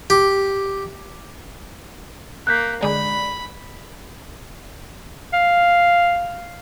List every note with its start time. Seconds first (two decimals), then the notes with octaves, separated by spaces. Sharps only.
0.10 G4
2.47 A#3 F#6 G6 B6
2.83 D3 G#3 D5 B5
5.33 F5